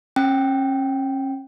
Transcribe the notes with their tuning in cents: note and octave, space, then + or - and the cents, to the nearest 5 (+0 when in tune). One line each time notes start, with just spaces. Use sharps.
C#4 -35 G5 +0